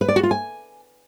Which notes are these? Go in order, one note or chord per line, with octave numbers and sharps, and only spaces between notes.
B4
D5
F#4
F4
G#5